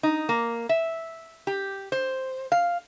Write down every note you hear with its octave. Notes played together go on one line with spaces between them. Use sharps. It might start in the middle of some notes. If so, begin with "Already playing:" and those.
D#4
A#3
E5
G4
C5
F5